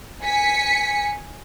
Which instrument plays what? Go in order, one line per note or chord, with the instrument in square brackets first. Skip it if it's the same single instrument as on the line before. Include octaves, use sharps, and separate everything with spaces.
[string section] G#5 B6 C#7